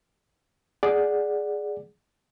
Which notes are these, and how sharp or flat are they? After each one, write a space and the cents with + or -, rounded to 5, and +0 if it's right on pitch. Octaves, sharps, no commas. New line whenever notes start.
G#4 +5 D5 +0 F#5 +0